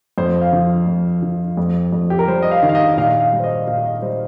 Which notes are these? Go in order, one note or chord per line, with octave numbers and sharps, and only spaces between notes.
F2 C5
F5
F3
F2
F3
F2
F2
G4
A#4
G3 C5
D#5
F5
D#3
F5
D#5
D#5
A#2 F5
F5
G3
C5
D#5
A#2 F5
D#5
G3 C5